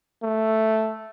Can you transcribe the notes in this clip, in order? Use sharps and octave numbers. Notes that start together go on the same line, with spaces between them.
A3